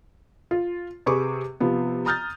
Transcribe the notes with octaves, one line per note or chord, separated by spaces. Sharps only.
F4
C3 G#4 B4 C#6 D6
C3 F3 B3
A#5 D#6 F6 G6 A6